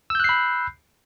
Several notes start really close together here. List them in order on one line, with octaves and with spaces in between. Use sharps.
E6 G6 F#6 C7 B5